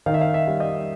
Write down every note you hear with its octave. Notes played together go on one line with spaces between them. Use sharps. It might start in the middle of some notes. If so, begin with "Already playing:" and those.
D#3 F5
E5
F5
E5
G3
D#5